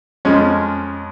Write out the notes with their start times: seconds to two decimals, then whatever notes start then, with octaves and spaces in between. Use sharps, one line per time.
0.25 F2 F3 G#3 C#4